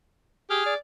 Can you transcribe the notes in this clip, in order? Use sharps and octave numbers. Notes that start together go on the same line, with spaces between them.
G4 G#4 F6
D5